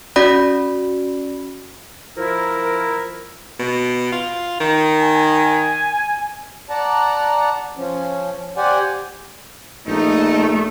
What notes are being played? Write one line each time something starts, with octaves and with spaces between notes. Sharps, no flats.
C#4 F#4 D5 B5
F3 E4 A#4
B2
F4
D#3
G#5
D5 F#5 A5 A#5
F3 C#4
G4 C5 D5 F#5 G#5
A#1 A3 D#4